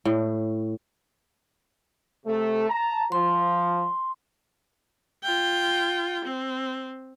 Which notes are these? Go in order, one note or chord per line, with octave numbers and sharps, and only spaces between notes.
A2
C3 A3
A5 A#5
F3 C6
F4 G5
C4